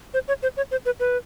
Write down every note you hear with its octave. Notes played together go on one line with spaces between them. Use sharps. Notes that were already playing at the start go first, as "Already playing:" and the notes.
C5
C#5
C5
C#5
C5
B4
B4